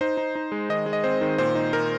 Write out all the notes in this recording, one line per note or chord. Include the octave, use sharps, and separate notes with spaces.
D#4 C5
D#4
D#4
G#3
D#3 D#5
G#3
D#5
C4 C5
D#3
A#2 C5
D#4
A#2 A#4